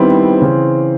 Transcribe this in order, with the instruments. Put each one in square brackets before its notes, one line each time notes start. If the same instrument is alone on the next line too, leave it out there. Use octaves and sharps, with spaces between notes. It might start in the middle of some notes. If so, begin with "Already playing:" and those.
Already playing: [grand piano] D#3 G3 B3 E4 [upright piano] C4
[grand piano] C#3 E3